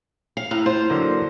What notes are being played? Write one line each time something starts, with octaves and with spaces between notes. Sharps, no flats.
F5
A2 F5 A#5
F4 C5
D3 F#3 A#3